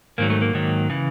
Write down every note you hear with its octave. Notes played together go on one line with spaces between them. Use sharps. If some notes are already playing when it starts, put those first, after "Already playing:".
G#2 D#3 F#3 A#3
A3
A#3
G#2 D#3 F#3
C#3 E3